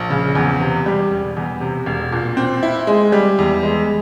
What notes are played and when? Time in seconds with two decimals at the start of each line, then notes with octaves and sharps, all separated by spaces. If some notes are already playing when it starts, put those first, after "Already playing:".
Already playing: A#1
0.10 C#3
0.35 E2
0.60 C3
0.86 G3
1.11 E1
1.36 E2
1.61 C3
1.86 E1
2.12 A#2
2.37 C4
2.63 E4
2.87 G#3
3.12 G3
3.39 E2
3.63 G#3